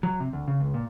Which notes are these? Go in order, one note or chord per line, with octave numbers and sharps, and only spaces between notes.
F#3
C3
D2
C#3
C#2
A#2